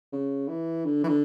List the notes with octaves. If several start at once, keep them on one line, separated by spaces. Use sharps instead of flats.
C#3
E3
D3
E3
D3